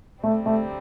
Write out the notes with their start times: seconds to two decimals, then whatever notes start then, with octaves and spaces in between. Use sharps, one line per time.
0.23 D2 C3 G3 A3 C4
0.46 A3